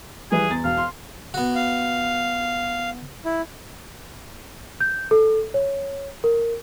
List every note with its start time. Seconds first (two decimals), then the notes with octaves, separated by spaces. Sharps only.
0.32 E3 G3 G#4 B4
0.50 E2 A6
0.64 E1 F5
0.77 C6
1.34 B3 F#4
1.55 F5
3.25 E4
4.80 G6
5.11 A4
5.54 C#5
6.24 A#4